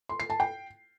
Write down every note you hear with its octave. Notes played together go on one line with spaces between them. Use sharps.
C6
C7
A5
G5